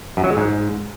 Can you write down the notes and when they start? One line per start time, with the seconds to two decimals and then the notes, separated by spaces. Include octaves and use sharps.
0.17 F#2
0.24 F#3
0.30 G#3
0.37 G#2